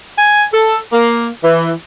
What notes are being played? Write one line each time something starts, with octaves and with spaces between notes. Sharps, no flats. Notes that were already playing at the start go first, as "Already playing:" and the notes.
G#5
A4
A#3
E3